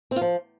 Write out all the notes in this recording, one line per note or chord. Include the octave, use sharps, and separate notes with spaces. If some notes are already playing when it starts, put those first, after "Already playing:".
C4
F4
F3